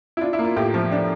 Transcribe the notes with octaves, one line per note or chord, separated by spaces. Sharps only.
E4
D4 F4
E4
A#3
F4
A2 F4 G4
F3
D4